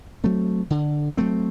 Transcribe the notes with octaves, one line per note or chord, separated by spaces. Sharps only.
F#3 A3 C4
D3
F#3 A3 C4